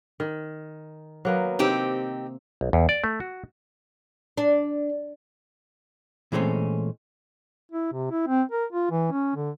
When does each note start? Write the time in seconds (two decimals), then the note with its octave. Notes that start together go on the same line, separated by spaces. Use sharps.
0.20 D#3
1.25 F#3 A#3 B3
1.59 C3 C4 D#4 G4
2.61 B1
2.73 E2
2.89 D5
3.04 A3
3.20 F#4
4.37 D4
6.32 A#2 E3 G#3 A3 C4 C#4
7.72 E4
7.93 C3
8.11 E4
8.27 C4
8.51 A#4
8.72 F4
8.91 E3
9.12 C#4
9.35 D3